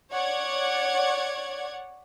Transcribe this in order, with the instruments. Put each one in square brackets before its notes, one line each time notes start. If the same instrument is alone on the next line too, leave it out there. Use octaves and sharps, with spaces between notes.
[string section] C#5 D5 F#5 G#6